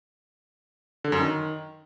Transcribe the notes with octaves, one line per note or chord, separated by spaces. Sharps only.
D3
F#2
D#3